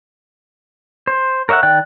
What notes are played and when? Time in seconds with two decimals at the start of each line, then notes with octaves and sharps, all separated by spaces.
1.07 C5
1.49 A#4 C#5 D#5 E5 F#5
1.63 D#3 D5 G5 F#6